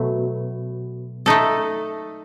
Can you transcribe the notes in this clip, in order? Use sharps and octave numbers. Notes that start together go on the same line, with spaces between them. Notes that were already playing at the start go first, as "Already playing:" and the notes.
Already playing: B2 F#3 A3
A3 D#4 A4